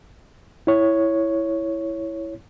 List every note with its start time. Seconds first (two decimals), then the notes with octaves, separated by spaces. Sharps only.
0.67 E4 C#5